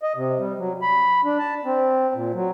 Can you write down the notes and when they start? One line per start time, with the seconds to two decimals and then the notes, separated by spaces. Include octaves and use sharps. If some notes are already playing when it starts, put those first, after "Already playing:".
0.03 D#5
0.16 C3
0.39 G3
0.58 F#3
0.82 B5
1.25 D4
1.39 A5
1.65 C4
2.15 A#2
2.34 F#3